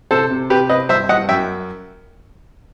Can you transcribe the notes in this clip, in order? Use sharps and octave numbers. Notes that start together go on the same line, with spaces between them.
C3 A4 C5
C3
C3 G4 B4
C4 B4 D#5
G2 C5 E5
G2 D#5 F#5
F#2 E5 G5